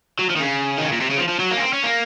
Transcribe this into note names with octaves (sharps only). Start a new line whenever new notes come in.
F#3
F3
D#3
C#3
D#3
C#3
A#2
C3
C#3
F3
F3
F#3
A#3
C#4
C4
C#4
A#3